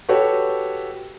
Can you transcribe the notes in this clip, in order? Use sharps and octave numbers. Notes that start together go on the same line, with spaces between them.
F#4 G4 A4 B4 C#5